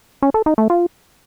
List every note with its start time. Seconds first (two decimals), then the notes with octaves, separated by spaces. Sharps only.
0.22 C#4
0.34 A4
0.46 D#4
0.58 A3
0.70 F4